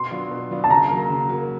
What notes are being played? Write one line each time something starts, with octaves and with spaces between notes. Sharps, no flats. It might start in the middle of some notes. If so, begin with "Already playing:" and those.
Already playing: B2 C6
F#3 B3 D4 F4
B2
F#3 B3 D4 F4
A5
C#3 A#5
F#3 A#3
C#3
F#3 A#3